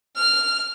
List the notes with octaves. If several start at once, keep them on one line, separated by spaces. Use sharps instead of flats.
F6